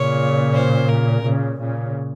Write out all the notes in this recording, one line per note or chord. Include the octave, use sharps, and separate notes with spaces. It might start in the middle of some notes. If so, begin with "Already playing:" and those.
Already playing: A#2 C#3 C#5
C5
A#4
A#2 C#3
A#2 C#3